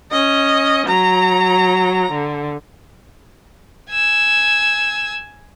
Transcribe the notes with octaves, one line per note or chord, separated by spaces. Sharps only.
C#4 D#5
F#3 A#5
D3
G#5 E6